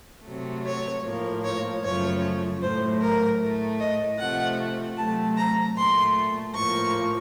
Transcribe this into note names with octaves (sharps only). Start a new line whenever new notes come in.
C3 F#3 A3
C#5
A2 F3 A#3
C#5
F#2 C#3 F3 A3 C#5
A2 F#3 A3 C5
A#4
A2 A3
D#5
C3 F3 A3 F#5
C3 F#3 A3 A5
A#5
A#2 A3 C6
A2 F3 A#3 C#6